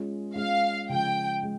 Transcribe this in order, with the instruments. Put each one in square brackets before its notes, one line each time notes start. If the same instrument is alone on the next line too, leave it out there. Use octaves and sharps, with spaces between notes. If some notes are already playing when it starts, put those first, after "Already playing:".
Already playing: [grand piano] G#3 C#4 F4
[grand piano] G#3 C#4 F4 [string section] F5
[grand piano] C#3 F3 G#3 [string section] G5
[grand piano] G#3